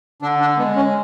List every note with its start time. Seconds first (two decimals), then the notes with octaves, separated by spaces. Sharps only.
0.22 D3 D4
0.40 D4
0.58 G#3 B3
0.76 C#4